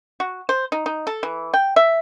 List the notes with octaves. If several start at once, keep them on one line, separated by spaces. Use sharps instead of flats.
F#4
C5
D#4
D#4
A4
E3
G5
E5